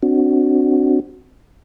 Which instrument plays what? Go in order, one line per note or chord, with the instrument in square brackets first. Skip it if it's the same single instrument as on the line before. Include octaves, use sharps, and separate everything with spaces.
[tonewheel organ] C4 D4 F#4